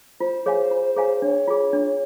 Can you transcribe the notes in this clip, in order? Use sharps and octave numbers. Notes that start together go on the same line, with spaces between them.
F4 C5
G#4 C#5 F5 G#5
F4
G#4 C#5 F5 G#5
D4 C#5
F4 G#4
D4